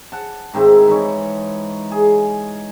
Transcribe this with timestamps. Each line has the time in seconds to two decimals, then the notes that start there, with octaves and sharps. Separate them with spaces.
0.12 F#5 A5
0.54 G#2 D#3 C4 E4
0.87 E3 D#4 C#5
1.91 G#4